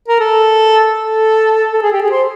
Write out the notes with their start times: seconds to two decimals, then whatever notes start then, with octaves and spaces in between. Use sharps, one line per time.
0.08 A#4
0.20 A4
0.97 A4
1.73 A4
1.82 G#4
1.92 G4
2.02 G#4
2.11 C5